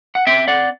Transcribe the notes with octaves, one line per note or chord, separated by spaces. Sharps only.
F#5
C4 E5 G5
D5 F#5